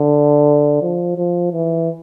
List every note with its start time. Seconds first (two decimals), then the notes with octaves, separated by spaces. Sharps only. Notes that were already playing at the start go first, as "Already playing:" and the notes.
Already playing: D3
0.82 F3
1.17 F3
1.52 E3